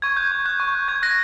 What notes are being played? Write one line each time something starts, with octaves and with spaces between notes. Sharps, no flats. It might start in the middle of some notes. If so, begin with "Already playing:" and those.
C#6 G#6
F#6 G6
C#6 G#6
F#6 G6
C#6
F#6
C#6 G#6
F#6 A#6